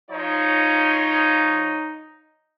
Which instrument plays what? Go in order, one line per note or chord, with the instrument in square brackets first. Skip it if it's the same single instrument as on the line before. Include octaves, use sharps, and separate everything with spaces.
[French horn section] F3 F4 C#5 [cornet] D#4